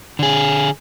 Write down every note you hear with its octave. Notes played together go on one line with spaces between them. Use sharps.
D3 G#4